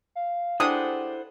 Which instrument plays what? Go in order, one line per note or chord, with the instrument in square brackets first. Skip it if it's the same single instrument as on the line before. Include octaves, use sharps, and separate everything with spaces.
[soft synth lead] F5
[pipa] G#3 D4 G4 [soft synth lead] E4 [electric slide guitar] A4 C5 F#5 [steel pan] D#6